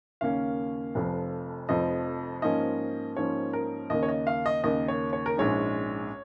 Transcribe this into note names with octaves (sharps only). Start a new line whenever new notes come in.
D#2 C#3 A#3 C#4 F5
F1 F2 F3
F1 F2 F3 D#5
G#2 F3 A#3 C#4 D#5
G#2 F3 A#3 C#4 C#5
A#4
D#2 C#3 A#3 D#5
C#5
D#5
F5
D#5
D#2 C#3 A#3 D#5
C#5
C#5
A#4
A#1 G#2 G#3 C#4 C#5